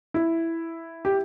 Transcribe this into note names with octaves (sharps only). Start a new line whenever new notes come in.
E4
G4